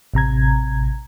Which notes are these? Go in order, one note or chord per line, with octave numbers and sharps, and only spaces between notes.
A1 C3 A#5 G#6